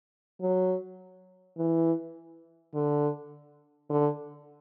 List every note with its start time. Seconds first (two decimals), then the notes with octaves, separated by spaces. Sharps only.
0.41 F#3
1.57 E3
2.74 D3
3.90 D3